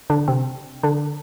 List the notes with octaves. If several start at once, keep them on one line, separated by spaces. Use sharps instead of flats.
D3 D4
C3 C4
D3 D4